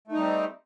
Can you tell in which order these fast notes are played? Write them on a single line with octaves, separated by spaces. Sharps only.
A3 D#4 G3 C4